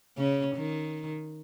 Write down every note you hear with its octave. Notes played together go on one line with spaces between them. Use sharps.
C#3 C#4
D#3